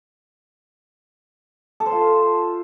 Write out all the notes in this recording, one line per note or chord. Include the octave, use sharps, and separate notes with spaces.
A4
C5
F4